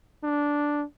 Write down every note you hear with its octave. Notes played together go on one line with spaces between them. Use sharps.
D4